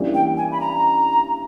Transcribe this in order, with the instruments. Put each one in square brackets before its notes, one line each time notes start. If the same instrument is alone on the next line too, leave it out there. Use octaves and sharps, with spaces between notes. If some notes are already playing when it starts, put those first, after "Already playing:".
Already playing: [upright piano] G2 E3 A#3 C#4 G4
[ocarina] G5
G#5
B5
A#5